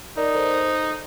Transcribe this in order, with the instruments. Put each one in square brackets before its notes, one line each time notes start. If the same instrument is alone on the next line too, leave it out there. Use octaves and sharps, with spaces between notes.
[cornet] D#4 [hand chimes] A#4 D5
[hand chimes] A4 C5